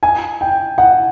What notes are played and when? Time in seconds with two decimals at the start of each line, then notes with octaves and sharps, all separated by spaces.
0.03 G#5
0.41 G5
0.78 F#5